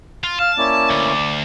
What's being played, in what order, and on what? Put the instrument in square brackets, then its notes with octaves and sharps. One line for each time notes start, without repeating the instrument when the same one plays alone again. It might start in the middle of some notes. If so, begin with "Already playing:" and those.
[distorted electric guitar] F4
[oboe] F5 [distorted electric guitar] A5
[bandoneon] A#3 C#4 E4 [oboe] D5
[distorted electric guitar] D2